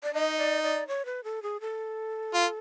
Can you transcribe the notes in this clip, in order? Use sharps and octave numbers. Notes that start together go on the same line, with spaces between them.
D5
D#4 D#5
D5
D5
C#5
B4
A4
G#4
A4
F4